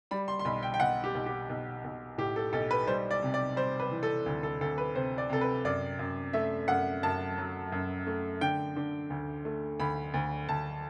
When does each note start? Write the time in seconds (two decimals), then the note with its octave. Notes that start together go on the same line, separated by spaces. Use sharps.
0.11 G3 B5
0.28 C6
0.39 C6
0.45 B1 B5
0.63 G5
0.74 G5
0.80 B1 F#5
1.04 G4
1.15 B1
1.26 G4
1.50 B1
1.84 B1
2.18 A2 G4
2.36 A4
2.53 B1 A4
2.71 B4
2.87 G3 C5
3.11 D5
3.22 C3
3.34 D5
3.56 G3 C5
3.80 B4
3.91 E3
4.03 A4
4.26 D2
4.43 A4
4.61 D2 A4
4.78 B4
4.95 C3 C5
5.18 D5
5.30 C3 A4
5.41 B4
5.65 F#2 D5
5.99 F#2
6.33 A3 E5
6.68 F#2 F#5
7.03 F#2 A5
7.38 F#3
7.72 F#2
8.07 A3
8.41 D3 G5
8.76 D3
9.10 D2
9.45 A3
9.80 D2 B5
10.14 D2
10.48 D2 A5